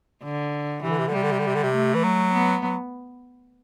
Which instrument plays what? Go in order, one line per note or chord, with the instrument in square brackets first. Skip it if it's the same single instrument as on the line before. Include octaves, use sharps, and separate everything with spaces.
[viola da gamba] D3
[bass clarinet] C3 [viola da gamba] E3
[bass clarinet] D3
C3
D3
[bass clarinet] C3 [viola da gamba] G3
[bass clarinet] D3
C3
D3
C3
D3
C3
[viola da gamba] A3
[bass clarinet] E3
F#3
[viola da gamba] B3
[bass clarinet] F#3